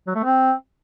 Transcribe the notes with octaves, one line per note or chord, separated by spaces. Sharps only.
F#3
A3
C4